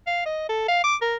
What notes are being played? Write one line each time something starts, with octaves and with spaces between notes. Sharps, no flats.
F5
D#5
A4
F5
D6
A#4